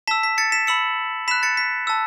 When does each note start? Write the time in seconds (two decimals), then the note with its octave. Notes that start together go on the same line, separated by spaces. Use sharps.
0.08 A5 E6 B6 E7
0.23 B6
0.38 A6 C#7
0.52 B6 E7
0.67 B5 E6 C#7 F#7
1.28 B5 F#6 B6 E7
1.43 A6 C#7
1.57 B6
1.87 A5 E6